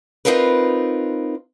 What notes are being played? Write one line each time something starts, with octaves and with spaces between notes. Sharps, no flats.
C4 D#4 F4 A#4 B4